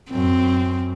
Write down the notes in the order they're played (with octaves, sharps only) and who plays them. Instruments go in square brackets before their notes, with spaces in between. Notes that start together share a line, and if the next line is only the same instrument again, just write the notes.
[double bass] F#2 [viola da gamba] C4